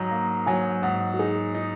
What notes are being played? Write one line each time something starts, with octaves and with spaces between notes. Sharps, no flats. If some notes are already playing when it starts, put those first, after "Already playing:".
Already playing: G#2 F#3 D#4 A#5
A#3
F#3 G#5
G#2 F#5
F#4
D#4 G#4
D#4